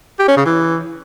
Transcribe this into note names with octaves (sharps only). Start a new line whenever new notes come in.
G4
C#4
C#3
E3